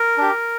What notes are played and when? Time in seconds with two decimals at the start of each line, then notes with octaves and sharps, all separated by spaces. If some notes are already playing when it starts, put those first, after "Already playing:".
Already playing: A#4
0.18 D4 G4